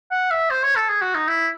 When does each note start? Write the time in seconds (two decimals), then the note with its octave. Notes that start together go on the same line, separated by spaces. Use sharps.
0.11 F#5
0.31 E5
0.50 C5
0.63 C#5
0.76 A4
0.89 G#4
1.02 F#4
1.15 D#4
1.28 E4